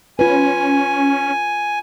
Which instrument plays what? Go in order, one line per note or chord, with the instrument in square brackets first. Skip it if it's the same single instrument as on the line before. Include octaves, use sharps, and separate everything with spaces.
[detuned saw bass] C#4 [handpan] F4 B4 [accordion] G#5